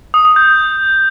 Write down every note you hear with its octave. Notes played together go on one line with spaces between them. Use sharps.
D#6
D#6
G6